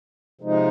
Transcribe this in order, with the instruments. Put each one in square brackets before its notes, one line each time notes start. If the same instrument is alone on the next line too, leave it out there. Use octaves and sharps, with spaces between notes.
[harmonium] C3 F3 G#3 D#4